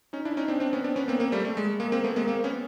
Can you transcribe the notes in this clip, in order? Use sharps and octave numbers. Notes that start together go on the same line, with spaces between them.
C#4 D#4
D4 E4
C#4 D#4
C4 D4
C4 D4
B3 C#4
C4 D4
B3 C#4
A#3 C4
A#3 C4
G3 A3
A3
G#3
G#3 A#3
A#3 C4
A3 B3
G#3 A#3
A#3 C4
B3 C#4